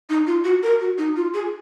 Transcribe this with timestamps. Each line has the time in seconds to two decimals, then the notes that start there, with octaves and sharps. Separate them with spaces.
0.09 D#4
0.27 F4
0.44 F#4
0.63 A#4
0.80 F#4
0.98 D#4
1.16 F4
1.34 G#4